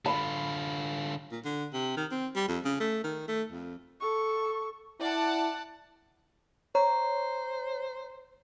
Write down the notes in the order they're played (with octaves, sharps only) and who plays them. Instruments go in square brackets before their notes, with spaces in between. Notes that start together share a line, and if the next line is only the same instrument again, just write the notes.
[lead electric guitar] D3 F4 [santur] B5
[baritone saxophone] A#2
D3
C3
D#3
C4
G3
F2
C#3
A3
D#3
A3
F2
[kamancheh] A4 C#6
[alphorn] E4 [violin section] D5 F#5 A5
[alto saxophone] C5 [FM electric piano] C#5 [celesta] A#5